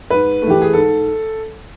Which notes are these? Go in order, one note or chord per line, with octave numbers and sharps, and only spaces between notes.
G#2 B4
A3
E3 G4
G#4
G#2 A4